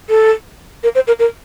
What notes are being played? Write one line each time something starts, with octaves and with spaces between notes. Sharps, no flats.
A4
A#4
C5
A#4
A#4